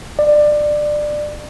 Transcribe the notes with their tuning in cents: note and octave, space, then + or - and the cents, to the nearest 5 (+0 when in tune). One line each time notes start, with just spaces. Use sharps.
D5 +20